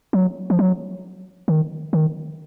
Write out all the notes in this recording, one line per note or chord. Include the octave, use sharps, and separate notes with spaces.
F#3
F3
F#3
D#3
D#3